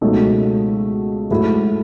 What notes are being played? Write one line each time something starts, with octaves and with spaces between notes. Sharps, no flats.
C#2 B2 F#3 A3 D#4
G#2 F#3 A3 E4